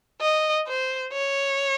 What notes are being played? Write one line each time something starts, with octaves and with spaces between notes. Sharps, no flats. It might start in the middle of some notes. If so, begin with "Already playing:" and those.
D#5
C5
C#5